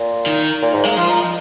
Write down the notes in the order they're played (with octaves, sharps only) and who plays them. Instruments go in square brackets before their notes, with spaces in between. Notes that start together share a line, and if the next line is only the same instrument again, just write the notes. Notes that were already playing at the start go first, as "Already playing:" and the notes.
Already playing: [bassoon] A#2
[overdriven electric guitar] D#3
[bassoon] A#2
G#2
[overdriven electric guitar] G#3 [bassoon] A#3
[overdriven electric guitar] F3 [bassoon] F4
[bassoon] D#4
D#4